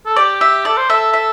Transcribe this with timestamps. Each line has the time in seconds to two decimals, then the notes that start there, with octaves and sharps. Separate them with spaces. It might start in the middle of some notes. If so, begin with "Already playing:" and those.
0.06 A4
0.16 G4 D5
0.41 E5
0.65 A4 D5
0.77 C5
0.90 A4 E5
1.13 E5